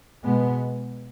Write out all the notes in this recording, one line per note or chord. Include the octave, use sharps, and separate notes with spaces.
B2 G#3 B3